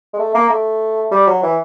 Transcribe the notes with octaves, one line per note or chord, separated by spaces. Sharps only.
G#3
A3
A#3
A3
G3
F#3
E3